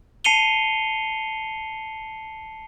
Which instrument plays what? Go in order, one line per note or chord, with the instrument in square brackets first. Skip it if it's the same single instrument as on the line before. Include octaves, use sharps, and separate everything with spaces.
[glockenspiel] A5 C7 C#7 D#7 F7 G7